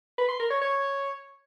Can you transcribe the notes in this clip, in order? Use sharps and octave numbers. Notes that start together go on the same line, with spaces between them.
B4
C6
A#4
C#5
C#5